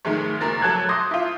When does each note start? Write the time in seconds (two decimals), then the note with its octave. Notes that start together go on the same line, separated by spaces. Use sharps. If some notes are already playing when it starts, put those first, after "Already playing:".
0.05 G#2 D#3 G#3 A3
0.41 F#1 A#4 A6
0.61 F#3 A4 A5 F#6 G#6
0.89 C6 D6 D#6 G6 A#6
1.11 E4 F4